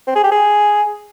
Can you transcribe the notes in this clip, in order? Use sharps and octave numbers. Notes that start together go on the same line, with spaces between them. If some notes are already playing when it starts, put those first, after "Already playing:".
C4
G#4
G4
G#4